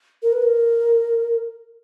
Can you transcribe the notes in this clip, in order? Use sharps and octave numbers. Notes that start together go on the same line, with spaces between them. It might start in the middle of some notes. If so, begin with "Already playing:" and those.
A#4
B4
A#4